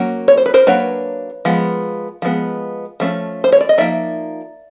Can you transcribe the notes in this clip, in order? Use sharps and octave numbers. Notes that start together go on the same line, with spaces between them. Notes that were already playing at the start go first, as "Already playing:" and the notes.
Already playing: F#3 A#3 C#4
C#5
C5
B4
A#4 C5
F#3 A#3 D4 B4 C#5
F3 G#3 B3
F3 G#3 B3
F3 A3 C#4
C5
C#5
D5
D#5
F3 A#3 D#4 D5 E5